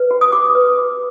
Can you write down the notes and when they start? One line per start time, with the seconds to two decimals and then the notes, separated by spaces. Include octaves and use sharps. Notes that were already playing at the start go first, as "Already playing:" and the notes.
Already playing: B4
0.11 F#4
0.21 D#6
0.32 F#4 D6
0.55 B4
0.78 F#4